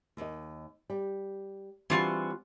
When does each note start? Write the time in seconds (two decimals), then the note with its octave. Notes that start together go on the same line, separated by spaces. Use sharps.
0.17 D#2 D#5
0.90 G3
1.90 E3 G3 C4 D4 F4 F#4